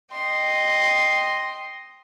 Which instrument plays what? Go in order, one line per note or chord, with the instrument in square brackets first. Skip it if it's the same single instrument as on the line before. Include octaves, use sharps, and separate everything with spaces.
[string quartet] D#5 G5 C6